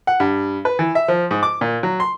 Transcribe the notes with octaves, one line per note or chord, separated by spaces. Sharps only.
F#5
G2
B4
E3
E5
F3
G#2
D6
A#2
F#3
C6